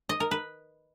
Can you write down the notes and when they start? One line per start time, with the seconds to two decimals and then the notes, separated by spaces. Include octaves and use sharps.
0.09 D#5
0.20 A#4
0.31 B4